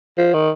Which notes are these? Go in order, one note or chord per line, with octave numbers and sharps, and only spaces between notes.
F3
D#3